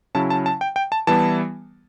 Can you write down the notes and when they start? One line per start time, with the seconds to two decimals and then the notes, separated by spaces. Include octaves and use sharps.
0.15 C#3 F#3 C#4 E4 A5
0.30 A5
0.46 A5
0.61 G5
0.76 G5
0.92 A5
1.07 E3 G3 B3 E4 A5